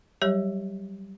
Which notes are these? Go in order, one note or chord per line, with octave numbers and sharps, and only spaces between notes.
F#3 G3 G4 C#5